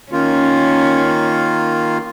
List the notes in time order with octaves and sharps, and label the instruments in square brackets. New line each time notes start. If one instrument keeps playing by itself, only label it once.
[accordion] D#3 A#3 F4 [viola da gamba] C#4